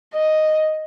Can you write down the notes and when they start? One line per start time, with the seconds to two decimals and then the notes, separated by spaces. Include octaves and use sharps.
0.15 D#5